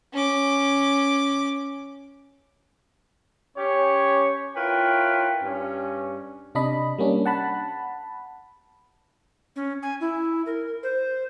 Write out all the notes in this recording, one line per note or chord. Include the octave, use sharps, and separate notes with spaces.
C#4 D6
C#4 G4 C#5
E4 F4 A#4 B4 C#5 G5
G2 C#4
C3 D4 D#5 B5
G3 A#3 C#4 D4
F#5 A5 B5
C#4
G#5
E4
A#4
C5